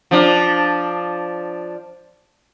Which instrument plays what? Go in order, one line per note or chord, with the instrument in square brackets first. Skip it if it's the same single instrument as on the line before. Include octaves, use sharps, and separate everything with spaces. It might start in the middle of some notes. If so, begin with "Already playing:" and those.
[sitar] F3 D4